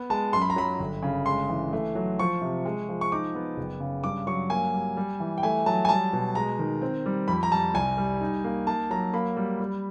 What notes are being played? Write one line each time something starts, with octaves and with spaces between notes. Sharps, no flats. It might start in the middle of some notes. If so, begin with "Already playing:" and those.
Already playing: B3
G#3 A5
F#2 C6
B5
A#5
F#3 B5
G1
C#3
G#3 C6
E3
A3
F#3
F3 C#6
C3
G#3
F3
C#6
D#4 D6
B3
F#1
C#3
G2 D6
F#3 C#6
A#3 G#5
G3
G3
E3
G5
A3 G#5
F#3 A5
G#5
G3 A5
B2
G#3 A#5
D#3
C4
G3
F2 B5
A#5
G3 A5
C2 G#5
G3
D#4
A#3
A#3 A5
F#3 A#5
A#3 B5
G3
G3